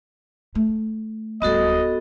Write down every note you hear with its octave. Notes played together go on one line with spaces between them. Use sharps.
A3
D1 G3 B3 F#4 A4 D#5